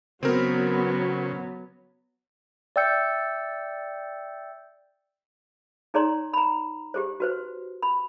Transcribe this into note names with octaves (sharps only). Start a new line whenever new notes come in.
C#3 F#3 B3 C4 A#4
D5 E5 G5 E6 G6 C#7
D#4 G#4 C#5 D5 A#5 C6
A#5 B5
G4 G#4 C5
F#4 B4 C5
B5